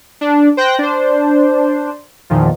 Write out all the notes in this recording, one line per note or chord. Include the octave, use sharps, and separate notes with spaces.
D4
C5 G5 F#6 G6 A#6
D4 C5
E2 A#2 D#3 F3